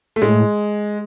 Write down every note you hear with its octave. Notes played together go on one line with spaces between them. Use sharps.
A3
A2 G#3